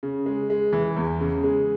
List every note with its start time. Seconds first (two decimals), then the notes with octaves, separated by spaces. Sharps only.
0.03 C#3
0.26 G#3
0.50 G#3
0.73 E3
0.96 E2
1.21 C#3
1.43 G#3